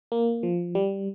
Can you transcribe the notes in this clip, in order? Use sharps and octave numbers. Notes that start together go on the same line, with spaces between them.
A#3
F3
G3